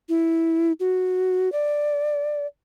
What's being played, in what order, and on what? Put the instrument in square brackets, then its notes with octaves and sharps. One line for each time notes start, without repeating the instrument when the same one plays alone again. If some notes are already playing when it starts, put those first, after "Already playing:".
[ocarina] E4
F#4
D5